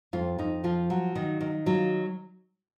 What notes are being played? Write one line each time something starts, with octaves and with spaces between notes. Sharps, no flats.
F2 F4
F2 D#4
F3 F4
F#3
D#3
D#3
F#3 F4